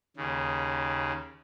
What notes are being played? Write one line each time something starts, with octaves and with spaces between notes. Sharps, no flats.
D#2 C#3